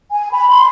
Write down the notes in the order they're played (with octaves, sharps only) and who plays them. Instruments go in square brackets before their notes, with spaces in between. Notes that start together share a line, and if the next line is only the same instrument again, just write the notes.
[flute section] G#5
B5
C6